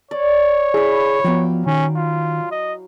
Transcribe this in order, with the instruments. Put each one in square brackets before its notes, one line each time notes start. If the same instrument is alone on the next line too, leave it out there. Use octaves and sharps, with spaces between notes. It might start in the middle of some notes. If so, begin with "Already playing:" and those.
[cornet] C#5 [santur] D5
[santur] E4 B5 [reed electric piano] G#4
[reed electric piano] F3 B3 [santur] F#3 F5 G5
[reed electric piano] D#3 [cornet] C#4
[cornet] F4
D#5